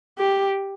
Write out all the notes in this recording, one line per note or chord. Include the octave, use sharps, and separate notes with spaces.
G4